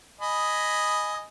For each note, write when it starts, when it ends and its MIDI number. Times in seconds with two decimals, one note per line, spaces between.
0.21 1.25 75
0.21 1.25 80
0.21 1.25 83